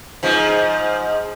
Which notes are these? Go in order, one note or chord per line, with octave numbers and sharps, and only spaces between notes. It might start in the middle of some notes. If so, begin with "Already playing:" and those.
G#2 F3